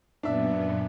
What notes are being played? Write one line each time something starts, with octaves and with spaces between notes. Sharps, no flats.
F#2 A#2 B3 D4 E5